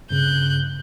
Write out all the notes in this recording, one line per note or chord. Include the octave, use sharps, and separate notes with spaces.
G2 C#3 F#6 G6